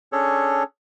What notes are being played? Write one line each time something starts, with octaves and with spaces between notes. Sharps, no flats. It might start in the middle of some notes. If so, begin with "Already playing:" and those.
C#4 D4 G#4 A4 C#5